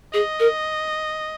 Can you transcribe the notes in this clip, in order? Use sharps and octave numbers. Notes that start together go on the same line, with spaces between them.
G#4 D#5
A#4